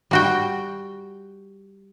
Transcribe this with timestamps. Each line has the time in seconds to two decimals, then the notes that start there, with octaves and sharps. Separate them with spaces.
0.11 G3 F#4 G5